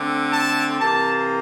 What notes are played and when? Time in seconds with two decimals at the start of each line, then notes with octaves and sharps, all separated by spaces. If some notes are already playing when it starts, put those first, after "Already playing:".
Already playing: D3 A3 C4
0.32 A5
0.79 C3 E3 A#3 A5